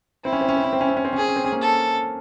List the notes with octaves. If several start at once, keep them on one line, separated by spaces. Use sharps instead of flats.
C4 E4
C#4
C4
C#4
C4
C#4
C4
C#4
C4
C#4
C4
C#4
C4 G#4
C#4
C4
C#4
A#3 C4
A4